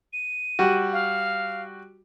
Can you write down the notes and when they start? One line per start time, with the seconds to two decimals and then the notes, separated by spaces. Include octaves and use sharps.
0.13 D#7
0.59 G3 F#4
0.93 F5